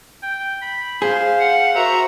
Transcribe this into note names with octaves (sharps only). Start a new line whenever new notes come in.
G5
B5
G#4 C5 F5
F#5
F#4 A#4 C5 E5 A#5